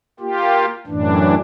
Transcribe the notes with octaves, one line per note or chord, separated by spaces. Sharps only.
A#3 F4 G4
F#2 A2 E3 D4